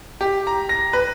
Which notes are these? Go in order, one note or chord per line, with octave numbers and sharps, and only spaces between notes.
G4
A#5
A#6
B4